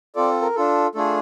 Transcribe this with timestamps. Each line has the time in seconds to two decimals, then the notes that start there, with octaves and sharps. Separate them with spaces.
0.15 C4 F4 A4 D5
0.42 A#4
0.55 D4 F4 A4
0.95 A3 D4 F4 G#4 A4